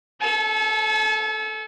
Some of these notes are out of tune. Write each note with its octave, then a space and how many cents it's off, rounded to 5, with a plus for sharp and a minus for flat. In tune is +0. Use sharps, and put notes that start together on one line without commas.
A4 -10 A5 -45